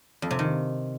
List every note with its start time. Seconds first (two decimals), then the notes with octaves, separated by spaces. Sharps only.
0.22 F2
0.31 C3
0.39 D#3